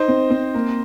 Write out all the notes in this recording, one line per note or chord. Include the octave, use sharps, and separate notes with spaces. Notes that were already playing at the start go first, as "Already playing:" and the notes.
Already playing: D#4 C5 D#5
C4
C4
A#3